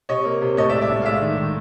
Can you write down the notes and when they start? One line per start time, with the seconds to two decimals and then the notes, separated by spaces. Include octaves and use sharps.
0.09 C3 C#5 D#5
0.25 A#3
0.42 C3
0.57 A2 C#5 D#5
0.69 D5 E5
0.74 G#3
0.81 D5 E5
0.90 A2
1.02 F5
1.05 G#3 D5 E5
1.21 D#3
1.37 D#3